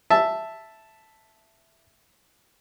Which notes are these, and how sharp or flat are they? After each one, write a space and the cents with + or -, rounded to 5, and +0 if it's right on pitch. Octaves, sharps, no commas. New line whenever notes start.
E5 +0 A5 +0